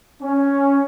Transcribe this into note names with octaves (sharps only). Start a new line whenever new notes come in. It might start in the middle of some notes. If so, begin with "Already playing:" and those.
C#4